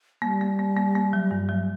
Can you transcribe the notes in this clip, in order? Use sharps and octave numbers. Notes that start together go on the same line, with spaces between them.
G3 A#3
A#3
A#3
A#3
A#3
F#3
G2
F#3